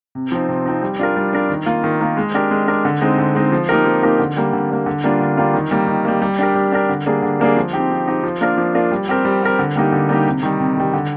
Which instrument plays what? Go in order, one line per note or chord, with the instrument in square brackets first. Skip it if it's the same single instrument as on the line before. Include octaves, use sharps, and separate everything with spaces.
[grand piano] C3
F3 C4 D#4
C3
F3 C4 D#4
G3
D4 F4 A#4
G3
D4 F4 A#4
D#3
A#3 F4
D#3
A#3 F4
G#3
D4 G4 A#4
G#3
D4 G4 A#4
D3
G#3 C4 D#4
D3
G#3 C4 D#4
F3
A#3 D#4 G4 A#4
F3
A#3 D#4 G4 A#4
D3
G3 A#3
D3
G3 A#3
D3
G3 A#3 D4 F4
D3
G3 A#3 D4 F4
D#3
G3 A#3
D#3
G3 A#3
G3
D4 G4 A#4
G3
D4 G4 A#4
D3
G3 A#3 D4 G#4
D3
G3 A#3 D4 G#4
F3
C4 D#4 G4
F3
C4 D#4 G4
F3
A#3 D4 F4 A#4
F3
A#3 D4 F4 A#4
G3
C4 G4 A#4
G3
C4 G4 A#4
D3
G3 A#3 D#4 G4
D3
G3 A#3 D#4 G4
C3
D#3 G3
C3
D#3 G3
D3